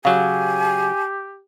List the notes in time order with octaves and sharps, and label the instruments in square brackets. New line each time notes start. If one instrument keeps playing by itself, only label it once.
[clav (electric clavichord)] C#3 F#3 [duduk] G4 [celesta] F5 [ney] G#5